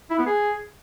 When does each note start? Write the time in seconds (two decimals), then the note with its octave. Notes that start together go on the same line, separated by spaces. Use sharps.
0.10 E4
0.19 B3
0.27 G#4